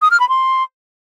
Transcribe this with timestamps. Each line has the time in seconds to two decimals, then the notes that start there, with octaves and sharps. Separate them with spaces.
0.02 D#6
0.11 F6
0.20 B5
0.29 C6